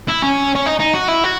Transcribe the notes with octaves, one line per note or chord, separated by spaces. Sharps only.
E4
C#4
C#4
D#4
D#4
F#4
E4
F#4